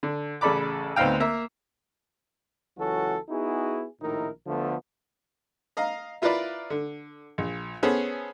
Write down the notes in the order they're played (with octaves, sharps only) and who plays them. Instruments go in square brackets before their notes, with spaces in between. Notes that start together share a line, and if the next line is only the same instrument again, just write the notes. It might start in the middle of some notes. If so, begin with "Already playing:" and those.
[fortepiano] D3
A1 C#3 A4 D5 B5 D6
D2 B3 C4 D#4 F5 G5
A#3 E5
[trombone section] C#2 E3 F#3 C#4 F#4 A4
B3 D#4 E4 F#4 G#4
A#1 A2 D#3 D#4 E4 A#4
D2 D3 F3 A3 B3
[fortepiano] D#5 F5 A#5
E4 F4 A#4 B4 D5 E5
D3
A#1
B3 C#4 G#4 A4 C5